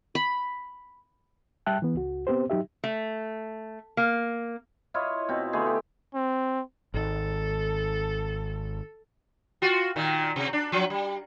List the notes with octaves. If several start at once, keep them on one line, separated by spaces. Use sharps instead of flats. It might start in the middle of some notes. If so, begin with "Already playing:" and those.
B5
G3 E5 G5 A5 F#6
E3 B3
C#2 F#4
B3 C4 G4 C5
F#3 D#4 G4 E5
A3
A#3
E4 F4 C#5 D#5
B2 C4
D3 A3 B3 G#4
G4
C4
G#1 D#3 A4
F4 F#4
A#2 D#3
C3
D4
F3 F#3
G3